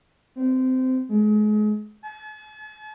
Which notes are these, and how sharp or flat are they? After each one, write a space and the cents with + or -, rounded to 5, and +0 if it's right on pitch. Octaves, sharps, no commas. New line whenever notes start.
C4 -20
G#3 +35
A5 -45